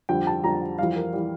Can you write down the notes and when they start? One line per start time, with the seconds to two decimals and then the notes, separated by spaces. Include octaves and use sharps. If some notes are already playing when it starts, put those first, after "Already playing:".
0.09 F2 D3 G3 G5
0.27 A5
0.44 F2 D3 G3 A#5
0.79 F2 E3 G3 F5
0.96 A#4
1.14 E3 G3